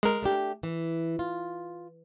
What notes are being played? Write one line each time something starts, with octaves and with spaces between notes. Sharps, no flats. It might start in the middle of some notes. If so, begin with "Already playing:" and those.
G#3 A#4
A3 D4 G4
E3
F4